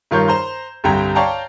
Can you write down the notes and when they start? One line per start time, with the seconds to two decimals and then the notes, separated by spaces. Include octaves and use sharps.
0.11 G2 D#3 F4 A#4 C#5 G6
0.28 C5 A#5 C6 G6
0.84 C2 G2 D3 G5 A#5 G#6
1.15 C#5 D5 F5 G5 A5 A#5